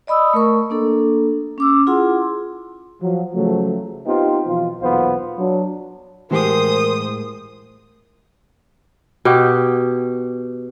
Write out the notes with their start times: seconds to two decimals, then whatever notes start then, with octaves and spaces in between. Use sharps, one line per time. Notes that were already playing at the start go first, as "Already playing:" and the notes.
0.07 D5 D#5 B5 D#6 E6
0.34 A3 A#4 C#6
0.70 A#3 D4 A4
1.58 C#4 D6 E6
1.87 E4 F4 G#4 F#5 C6
3.02 F3 F#3
3.35 C#3 F3 F#3 A3
4.06 B3 C4 D#4 F4 G4
4.47 B2 E3 F3 F4
4.81 B1 E2 A#2 B3 F4 C5
5.38 F#3 D4
6.31 A2 E3 G#3 G4 G#4 A#4 C5 D#6
9.25 B2 G4